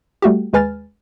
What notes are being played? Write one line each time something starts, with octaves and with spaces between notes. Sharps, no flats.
G3 A3 F#4 G4
D#2 G#3 B4 G#5 F6 A6